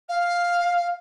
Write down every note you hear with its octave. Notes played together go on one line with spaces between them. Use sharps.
F5